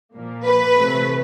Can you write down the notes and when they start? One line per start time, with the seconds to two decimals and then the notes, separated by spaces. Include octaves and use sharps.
0.15 A#2 F3 A#3
0.46 B4
0.77 C3 E3 A3